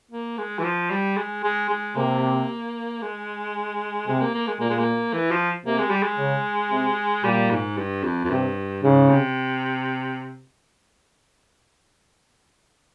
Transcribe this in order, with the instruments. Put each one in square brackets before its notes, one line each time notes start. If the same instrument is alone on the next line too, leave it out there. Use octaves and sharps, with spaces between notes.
[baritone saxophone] A#3
G#3
E3
F3
G3
G#3
G#3
G#3
[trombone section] C3 [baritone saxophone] A#3
[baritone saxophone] G#3
[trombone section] C3 [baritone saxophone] G#3
[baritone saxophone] A#3
A#3
G#3
[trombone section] A#2 [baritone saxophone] A#3
[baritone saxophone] G#3
A#3
E3
F3
[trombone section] C3 [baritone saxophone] A#3
[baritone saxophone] G#3
G3
G#3
[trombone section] C#3
C3
[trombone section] A#2 [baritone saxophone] G3
[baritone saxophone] G#2
G2
F2
F2
[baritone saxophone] G2 [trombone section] C3
[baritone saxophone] G#2 [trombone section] C#3
[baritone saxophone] C3